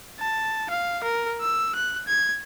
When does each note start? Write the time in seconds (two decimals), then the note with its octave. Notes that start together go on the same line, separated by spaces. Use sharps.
0.19 A5
0.70 F5
1.03 A#4
1.41 E6
1.75 F#6
2.07 G#6